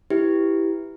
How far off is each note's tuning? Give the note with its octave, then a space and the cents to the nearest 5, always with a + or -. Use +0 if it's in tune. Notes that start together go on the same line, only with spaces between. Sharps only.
E4 +0 G4 +0 B4 +0